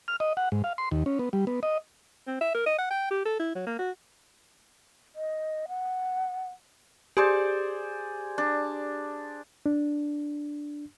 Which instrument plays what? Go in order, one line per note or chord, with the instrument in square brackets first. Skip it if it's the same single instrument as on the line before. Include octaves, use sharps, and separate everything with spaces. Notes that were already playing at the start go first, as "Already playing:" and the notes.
[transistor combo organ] F6
D#5
F#5
G#2
F5
C6
D#2
C#4
B3
G3
B3
D#5
[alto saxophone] C4
E5
A#4
D#5
F#5
G5
G4
A4
E4
F#3
A#3
F#4
[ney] D#5
F#5
[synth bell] G4 [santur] G#4 C5 D5
[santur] D4
[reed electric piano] D4